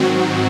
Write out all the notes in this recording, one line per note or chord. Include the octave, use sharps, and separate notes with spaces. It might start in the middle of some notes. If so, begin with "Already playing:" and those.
Already playing: G#2 D#3 F#3 C4 F#4